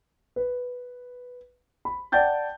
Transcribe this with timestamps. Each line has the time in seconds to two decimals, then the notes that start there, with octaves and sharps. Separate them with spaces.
0.36 B4
1.85 B5
2.12 D5 F#5 G5 A5 G6 A6